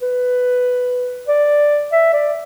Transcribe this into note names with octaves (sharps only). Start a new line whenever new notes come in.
B4
D5
E5
D5